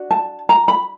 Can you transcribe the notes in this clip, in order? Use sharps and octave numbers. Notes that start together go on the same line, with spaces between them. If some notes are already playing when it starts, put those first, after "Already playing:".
Already playing: D4 F#4
A5
A#5
B5